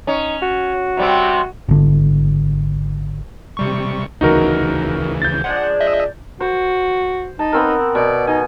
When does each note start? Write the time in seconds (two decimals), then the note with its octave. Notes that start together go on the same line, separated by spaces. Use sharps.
0.07 C#4 D#4
0.42 F#4
0.97 C3 G3 C4
1.68 G#1 D3
3.57 C3 G3 C#6
4.21 D2 C#3 E3 D#4 F#4 A#4
5.22 G6 A6
5.44 F3 G#3 D4 F#5
5.80 D#5 E5
6.40 F#4 C5
7.39 D#4 A5
7.53 B3 C4 A#4
7.95 B2 D5
8.27 D#4 G#5